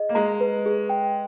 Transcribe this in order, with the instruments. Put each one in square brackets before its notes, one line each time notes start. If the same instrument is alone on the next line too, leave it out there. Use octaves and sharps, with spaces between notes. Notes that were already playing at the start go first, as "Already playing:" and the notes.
Already playing: [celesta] G#4 D#5
[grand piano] A#3
[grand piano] G#3 [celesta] A#5
[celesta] B4
G#4
G5